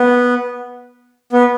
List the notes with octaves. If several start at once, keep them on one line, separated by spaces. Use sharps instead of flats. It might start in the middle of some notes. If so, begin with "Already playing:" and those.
Already playing: B3
B3